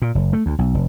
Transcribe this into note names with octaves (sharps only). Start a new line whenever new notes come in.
A#2
F#1
A3
D2
B1
F1